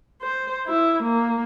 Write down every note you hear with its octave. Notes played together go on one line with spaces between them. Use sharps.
C5
E4
A#3